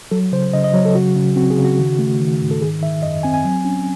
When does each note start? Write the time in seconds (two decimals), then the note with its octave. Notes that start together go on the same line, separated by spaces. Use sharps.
0.11 F#3 A4
0.32 C#3 C5
0.53 C#3 D#5
0.64 D#5
0.74 F#3 C#5
0.85 A4
0.95 C#3 F#4
1.16 C#3
1.36 C4 F#4
1.50 G#4
1.58 C#3
1.64 F#4
1.79 D#3
1.99 A3
2.20 D#3
2.41 G#2
2.51 A4
2.61 D#3 G#4
2.82 D#3 E5
3.03 F#2 D#5
3.23 C4 G#5
3.34 G#5
3.45 F#3
3.65 C#4